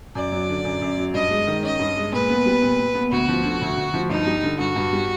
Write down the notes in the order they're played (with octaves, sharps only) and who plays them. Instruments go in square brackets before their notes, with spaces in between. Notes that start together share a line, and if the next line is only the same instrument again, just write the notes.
[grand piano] F#2 [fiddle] D5
[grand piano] F#3
D3
F#2
F#2
F#3
[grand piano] G2 [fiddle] D#5
[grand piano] G#3
D#3
[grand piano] C#4 [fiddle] D#5
[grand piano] G2
G#3
[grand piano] A#2 [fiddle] B4
[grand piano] B3
G3
A#2
A#2
B3
[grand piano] D2 [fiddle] F#4
[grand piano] F3
D3
D2
D2
F3
[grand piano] G2 [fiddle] D#4
[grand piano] G3
D3
[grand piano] G2 [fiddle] F#4
[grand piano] G2
G3